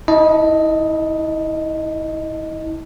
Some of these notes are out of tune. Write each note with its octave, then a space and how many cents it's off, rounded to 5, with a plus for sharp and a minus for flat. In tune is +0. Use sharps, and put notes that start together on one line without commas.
E4 -35 D#5 +0 A5 +10